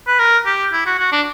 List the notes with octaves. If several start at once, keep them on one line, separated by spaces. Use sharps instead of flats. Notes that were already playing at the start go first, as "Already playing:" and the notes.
B4
A#4
G4
E4
F#4
F#4
D4